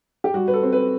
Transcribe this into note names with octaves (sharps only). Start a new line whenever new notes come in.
G4
G3 F#4
B4
A4
C4
B4